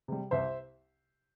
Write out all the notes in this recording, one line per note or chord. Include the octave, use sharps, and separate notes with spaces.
C3 G3
C2 C5 E5